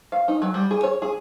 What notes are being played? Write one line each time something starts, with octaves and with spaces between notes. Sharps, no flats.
F5
D#4
F#3
G3
G#4
C#5
G#4